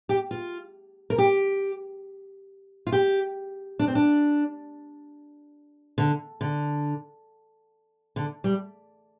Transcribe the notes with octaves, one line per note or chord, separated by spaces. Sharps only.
G4
F4
A#4
G4
F4
G4
D4
C4
D4
D3
D3
D3
G3